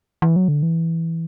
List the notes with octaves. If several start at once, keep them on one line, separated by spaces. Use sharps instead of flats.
E3
F#3
D3
E3